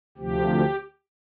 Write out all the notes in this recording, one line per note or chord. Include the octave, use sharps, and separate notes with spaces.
D2 C3 F3 G4